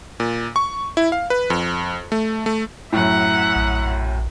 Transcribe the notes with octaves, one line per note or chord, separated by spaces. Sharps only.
A#2
C#6
E4
F5
B4
F2
A3
A3
F#2 A2 E5 F#5 A#5
A#1